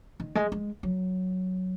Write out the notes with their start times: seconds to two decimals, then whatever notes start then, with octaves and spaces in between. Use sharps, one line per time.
0.20 D#3
0.35 G#3
0.52 G#3
0.83 F#3